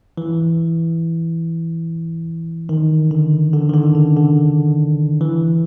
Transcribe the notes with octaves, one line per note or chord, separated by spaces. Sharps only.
E3
D#3
D3
D3
D#3
D3
C#3
D3
E3